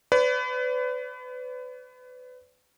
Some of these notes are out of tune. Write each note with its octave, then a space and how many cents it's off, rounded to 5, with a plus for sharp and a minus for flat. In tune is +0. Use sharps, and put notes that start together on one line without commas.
B4 +30 D5 -45